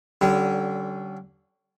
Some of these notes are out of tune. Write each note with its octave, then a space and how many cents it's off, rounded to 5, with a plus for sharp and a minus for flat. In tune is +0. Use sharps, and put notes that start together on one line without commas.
D3 +0 G3 -30 C#4 +0